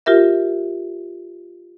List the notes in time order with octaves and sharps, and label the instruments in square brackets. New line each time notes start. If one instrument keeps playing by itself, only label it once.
[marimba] F4 G4 A#4 E5